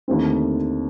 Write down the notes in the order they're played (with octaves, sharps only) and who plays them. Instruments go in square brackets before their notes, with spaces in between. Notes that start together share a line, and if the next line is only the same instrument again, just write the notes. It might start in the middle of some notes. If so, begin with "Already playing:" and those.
[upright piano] D#2 D3 A3 C4